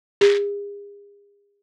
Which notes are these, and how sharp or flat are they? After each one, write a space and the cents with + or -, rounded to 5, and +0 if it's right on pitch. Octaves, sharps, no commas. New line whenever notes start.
G#4 -40